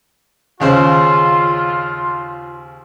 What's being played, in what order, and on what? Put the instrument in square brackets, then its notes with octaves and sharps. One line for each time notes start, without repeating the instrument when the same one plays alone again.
[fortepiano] D#2 C#3 C5 [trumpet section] F4 C6